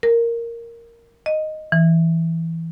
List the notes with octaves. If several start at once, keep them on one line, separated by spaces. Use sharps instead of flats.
A#4
D#5
E3